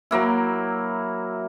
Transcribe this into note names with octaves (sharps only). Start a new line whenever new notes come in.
F#3 A#3 E4